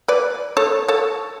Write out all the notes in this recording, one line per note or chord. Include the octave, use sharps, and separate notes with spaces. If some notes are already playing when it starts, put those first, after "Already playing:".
B4 D5
A4 C#5
A4 C#5